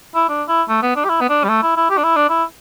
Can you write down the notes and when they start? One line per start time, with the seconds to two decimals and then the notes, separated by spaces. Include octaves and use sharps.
0.15 E4
0.29 D4
0.48 E4
0.69 A3
0.82 B3
0.96 D4
1.04 G4
1.09 E4
1.21 B3
1.29 D4
1.44 G3
1.49 A3
1.62 E4
1.76 E4
1.90 G4
1.98 D4
2.04 E4
2.16 D4
2.29 E4